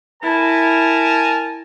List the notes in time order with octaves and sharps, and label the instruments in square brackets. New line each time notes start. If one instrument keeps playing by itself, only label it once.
[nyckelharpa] E4 [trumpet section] A#4 G#5 A5